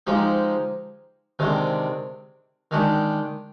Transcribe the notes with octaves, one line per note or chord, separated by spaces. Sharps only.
F3 G#3 D#4 G4
C3 D#3 G#3 D4
D#3 G#3 D4 G4